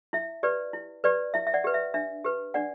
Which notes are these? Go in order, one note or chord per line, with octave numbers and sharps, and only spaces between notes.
E4 E5
G4 B4 D5
E4
G4 B4 D5
E4 E5
E5
D5 F#5
G4 B4
E5
D4 E5
G4 B4
D4 D5 F#5